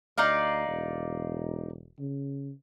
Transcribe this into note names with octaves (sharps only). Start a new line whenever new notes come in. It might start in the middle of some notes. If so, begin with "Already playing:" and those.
D2 D#4 D5 F5
E1
C#3